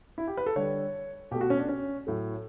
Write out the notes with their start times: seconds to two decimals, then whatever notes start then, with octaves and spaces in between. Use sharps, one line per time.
0.18 E4
0.27 G4
0.37 B4
0.46 A4
0.56 D3 G3 C#5
1.31 B2 G4
1.35 A3
1.41 F#4
1.50 C#4
1.59 D4
1.69 C#4
2.07 A2 F#3 A3